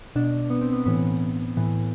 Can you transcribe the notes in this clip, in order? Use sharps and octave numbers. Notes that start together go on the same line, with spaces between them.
B2 D4
B3
C4
B3
A2 E3 B3
A2 E3